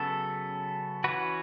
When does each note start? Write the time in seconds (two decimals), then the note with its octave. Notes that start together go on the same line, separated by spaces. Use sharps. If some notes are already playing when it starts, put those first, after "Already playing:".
Already playing: C#3 F#3 B3 A4
1.04 E3 C#4 F#4 B4